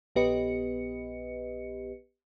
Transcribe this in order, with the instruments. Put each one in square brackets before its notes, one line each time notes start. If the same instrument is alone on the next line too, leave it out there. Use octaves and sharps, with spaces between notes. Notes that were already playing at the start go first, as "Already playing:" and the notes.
[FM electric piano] A#1 B3 G4 B4 D#5 C#7